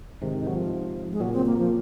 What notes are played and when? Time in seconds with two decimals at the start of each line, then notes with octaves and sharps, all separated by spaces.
0.21 G#2 C3 D#3
0.38 D#3
0.47 F#3
0.55 F3
1.12 G#3
1.20 A#2 C#3 F#3
1.33 C4
1.46 A#3
1.58 F3